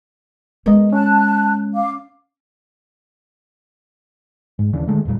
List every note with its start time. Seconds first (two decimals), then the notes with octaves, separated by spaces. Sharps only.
0.66 G#3 B3 A#4 D#5
0.93 C#4 A5 F#6
1.75 F5 D6
4.59 G#2
4.73 D#2 C#3 E3 D4
4.87 D3 D#3 G#3 A3
5.05 D1 E2 A#2 G3